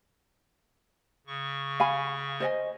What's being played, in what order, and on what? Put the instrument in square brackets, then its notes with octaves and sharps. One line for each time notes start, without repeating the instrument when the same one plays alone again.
[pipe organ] C#3 C#6
[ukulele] F5 G#5 B5
C5 D#5 G#5